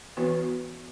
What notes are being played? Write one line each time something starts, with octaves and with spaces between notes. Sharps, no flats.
E3 B3 F#4 B4